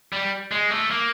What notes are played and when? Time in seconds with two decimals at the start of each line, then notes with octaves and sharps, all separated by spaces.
0.13 G3
0.51 G#3
0.71 A3
0.91 A#3